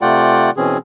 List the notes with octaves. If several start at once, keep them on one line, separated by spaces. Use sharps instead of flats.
C3 A3 F4 D5 F#5 G5
B2 E3 C4 C#4 G#4